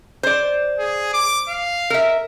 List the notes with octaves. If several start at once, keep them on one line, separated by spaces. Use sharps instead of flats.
C5 D5
G#4
D6
F5
A#4 E5